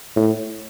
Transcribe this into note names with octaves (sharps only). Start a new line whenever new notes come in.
A2